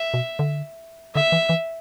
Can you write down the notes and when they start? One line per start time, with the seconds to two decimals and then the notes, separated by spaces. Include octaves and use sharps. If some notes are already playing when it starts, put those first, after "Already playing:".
Already playing: E5
0.14 B2
0.39 D3
1.15 D3 E5
1.32 E3
1.49 E3